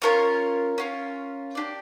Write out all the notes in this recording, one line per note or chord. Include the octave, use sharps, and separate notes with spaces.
C#4 F4 A#4 C#5
C#4 F4 A#4
D4 G4 D5